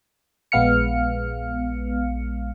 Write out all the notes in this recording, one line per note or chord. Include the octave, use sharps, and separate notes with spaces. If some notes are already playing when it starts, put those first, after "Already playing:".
A#1 G#3 B3 F5 F6 C#7